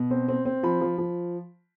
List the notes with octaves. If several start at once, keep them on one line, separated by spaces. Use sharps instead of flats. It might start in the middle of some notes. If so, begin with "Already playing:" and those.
Already playing: B2
C4
C4
C4
F3 B5
F3
F3